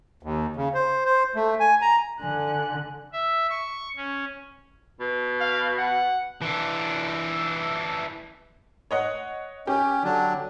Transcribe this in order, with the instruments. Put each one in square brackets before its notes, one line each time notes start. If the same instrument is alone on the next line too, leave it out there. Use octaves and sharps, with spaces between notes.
[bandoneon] D#2
C#3
C5
C5
A3
G#5
A#5
[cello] D3 [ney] G#5 [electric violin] F#6
[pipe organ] E5
C#6
C#4
[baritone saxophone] B2
[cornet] F5
F#5
[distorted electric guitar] E3 D4
[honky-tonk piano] C#5 D#5 F#5
[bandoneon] C#4 [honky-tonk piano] G4
[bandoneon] D3 F#3 D4